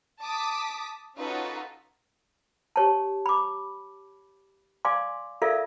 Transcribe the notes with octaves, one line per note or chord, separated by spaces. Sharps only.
A5 D6 D#6 B6
C#4 D#4 F4 F#4 A4 B4
G4 C#5 A5
B5 D6
D5 F5 G#5 C6 D6
F4 A4 A#4 D5 E5 F5